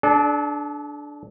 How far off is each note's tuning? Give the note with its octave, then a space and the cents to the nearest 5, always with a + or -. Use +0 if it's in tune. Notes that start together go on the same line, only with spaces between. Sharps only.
D4 +0 A4 -40